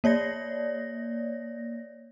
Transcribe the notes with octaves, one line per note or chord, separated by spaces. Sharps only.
A#3 C#5 D5 A#6